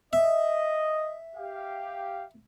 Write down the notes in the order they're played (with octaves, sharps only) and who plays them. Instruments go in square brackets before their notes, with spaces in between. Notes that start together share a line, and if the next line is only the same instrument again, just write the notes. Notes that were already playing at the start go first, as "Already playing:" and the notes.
[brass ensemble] D#5 [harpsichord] E5
[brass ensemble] G4 F5